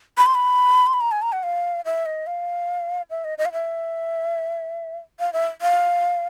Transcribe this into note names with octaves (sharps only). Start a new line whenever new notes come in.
B5
C6
B5
C6
B5
A#5
G#5
A#5
F#5
F5
E5
D#5
F5
E5
D#5
D#5
F5
E5
F5
E5
F5